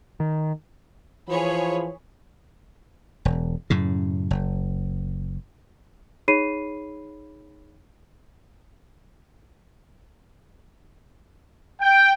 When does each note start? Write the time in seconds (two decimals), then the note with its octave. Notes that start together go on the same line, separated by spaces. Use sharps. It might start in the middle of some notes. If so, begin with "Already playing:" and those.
0.20 D#3
1.29 E3 F3 G#4 C#5 B5
3.25 E1
3.70 F#2 A2 C#3
4.31 F#1
6.28 D#4 G#4 C#5 B5 C7 D#7
11.80 G5